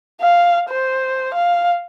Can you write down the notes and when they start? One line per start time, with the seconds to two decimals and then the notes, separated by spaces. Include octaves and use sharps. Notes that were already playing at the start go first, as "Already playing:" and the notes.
0.21 F5
0.69 C5
1.34 F5